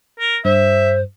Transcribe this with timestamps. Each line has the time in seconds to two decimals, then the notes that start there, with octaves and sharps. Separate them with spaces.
0.19 A#4
0.45 G2 C5 E5